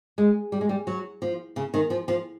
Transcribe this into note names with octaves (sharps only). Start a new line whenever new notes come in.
G#3
G3
G#3
G3
F#3
F3
C#3
D#3
F3
F3